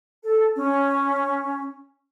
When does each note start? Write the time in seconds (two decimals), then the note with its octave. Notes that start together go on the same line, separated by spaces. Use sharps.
0.23 A4
0.55 C#4